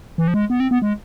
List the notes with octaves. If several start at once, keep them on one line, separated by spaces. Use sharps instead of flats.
E3
F3
G#3
B3
C4
B3
G#3